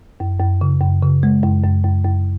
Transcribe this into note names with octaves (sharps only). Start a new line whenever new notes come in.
F#2
F#2
C#3
F#2
C#3
G#3
F#2
F#2
F#2
F#2